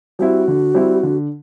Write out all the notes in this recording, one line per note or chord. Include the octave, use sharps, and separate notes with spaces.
G3 C4 E4 F#4
D3
G3 C4 E4
D3